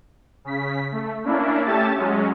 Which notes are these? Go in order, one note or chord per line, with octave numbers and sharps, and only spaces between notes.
C#3 B6
A3
A#3 C#4 D4 E4
A3 C#4 G4 E5 A5 A6
F#3 G#3 C#4